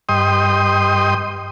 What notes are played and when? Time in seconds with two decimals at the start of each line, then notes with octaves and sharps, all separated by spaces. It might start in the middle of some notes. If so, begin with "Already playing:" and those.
0.09 G2 D#5 G5 C6 D#6